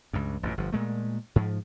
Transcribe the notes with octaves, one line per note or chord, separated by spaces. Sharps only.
C#2 G2
A1 F#2 A#2
G1 F3
A#2 G#3 A3
G#2 F3